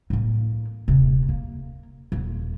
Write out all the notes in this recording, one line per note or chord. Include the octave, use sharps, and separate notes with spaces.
A2 A#3
D#1 C3
A#3
D#1 F4